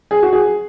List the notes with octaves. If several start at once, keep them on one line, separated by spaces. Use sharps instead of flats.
G#4
F#4
G#4